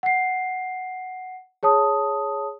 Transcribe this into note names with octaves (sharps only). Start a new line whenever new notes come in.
F#5 C7
G#4 C#5 A5 D#6